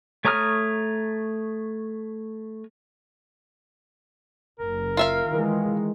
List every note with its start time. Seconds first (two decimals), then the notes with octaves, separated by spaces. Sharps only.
0.25 A3 C#5 A#5 D#6 F6
4.59 F#1 A#4
4.97 F4 E5 F5
5.28 D#3 E3 G#3